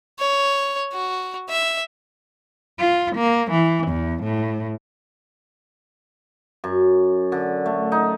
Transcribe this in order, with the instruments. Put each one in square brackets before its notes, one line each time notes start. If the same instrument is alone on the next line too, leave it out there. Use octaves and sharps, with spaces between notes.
[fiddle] C#5
F#4
E5
[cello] F4
A#3
E3
E2
A2
[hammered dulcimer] F#2
D3
A3
D#4